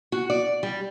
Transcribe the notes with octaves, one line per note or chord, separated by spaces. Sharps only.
F#4
D5
G3